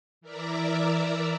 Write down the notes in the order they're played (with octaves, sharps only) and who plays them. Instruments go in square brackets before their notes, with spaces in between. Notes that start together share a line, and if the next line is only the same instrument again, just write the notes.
[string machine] E3 A#4 D5 E5 A#5